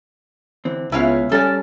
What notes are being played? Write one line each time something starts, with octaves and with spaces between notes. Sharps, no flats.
D3 E3 C4
C#2 B3 C#4 E4 C#5 F5
G3 C#4 A4 D5 G#5